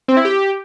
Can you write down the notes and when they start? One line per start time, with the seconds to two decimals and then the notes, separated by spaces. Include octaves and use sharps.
0.08 C4
0.17 E4
0.25 G4